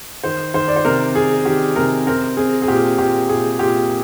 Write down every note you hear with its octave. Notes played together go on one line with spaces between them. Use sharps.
D#3 C5
D#3 C5
D5
C5
C3 A#4
C3 G#4
D#3 G4
C3 A#4
C4 A#4
C4 G#4
G#4
A#2 G4
A#2 G4
A#2 G#4
A#2 G4